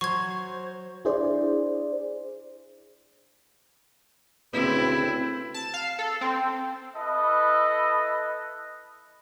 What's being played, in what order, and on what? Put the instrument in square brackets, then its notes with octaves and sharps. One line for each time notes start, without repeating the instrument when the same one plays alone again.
[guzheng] F#3 C6 [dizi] C5 [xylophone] C#6 G#6
[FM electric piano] D4 E4 G#4 C5 D5
[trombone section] D2 C#3 B4 [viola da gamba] C4 E4
[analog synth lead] A5
F5
A4
C4
[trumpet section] E4 A4 B4 D#5